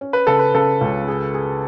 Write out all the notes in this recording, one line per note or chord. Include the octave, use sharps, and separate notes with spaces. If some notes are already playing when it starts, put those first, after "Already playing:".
C#4
B4
C#3 A4
B4
C#3 A4
C#2
G#4
G#4